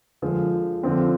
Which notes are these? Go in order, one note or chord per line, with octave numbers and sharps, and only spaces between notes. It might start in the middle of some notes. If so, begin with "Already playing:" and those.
D3 F3 G#3
D3 F3 C4